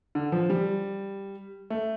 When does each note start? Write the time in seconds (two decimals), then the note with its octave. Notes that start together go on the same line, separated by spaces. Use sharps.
0.15 D3
0.32 F3
0.50 G3
1.70 A3